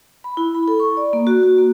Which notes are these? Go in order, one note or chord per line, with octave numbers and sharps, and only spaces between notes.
B5
E4
B5
A4
C#6
D5
A#3
F#4
F#4
A#3